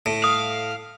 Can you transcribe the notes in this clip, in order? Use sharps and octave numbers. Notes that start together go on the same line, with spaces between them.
A2
F5 D#6